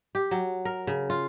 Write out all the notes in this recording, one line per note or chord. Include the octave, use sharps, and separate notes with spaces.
G4
F#3
A#4
C#3
F4